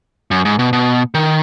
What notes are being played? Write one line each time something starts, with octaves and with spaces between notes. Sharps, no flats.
F#2
G#2
B2
B2
D#3